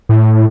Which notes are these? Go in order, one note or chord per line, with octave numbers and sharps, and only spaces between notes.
A2